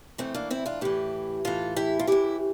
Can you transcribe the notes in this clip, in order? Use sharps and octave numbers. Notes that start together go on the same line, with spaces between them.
A2 E3 A3 C4
A#3 D4
C4 E4
D4 F4
A2 E3 E4 G4
A2 E3 F4 A4
E4 G4
F4
A2 E3 E4 G4